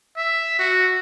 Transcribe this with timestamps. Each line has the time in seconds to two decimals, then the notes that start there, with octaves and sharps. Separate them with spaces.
0.17 E5
0.59 F#4